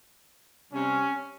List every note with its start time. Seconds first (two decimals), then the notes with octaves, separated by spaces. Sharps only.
0.73 C3 G3 C#4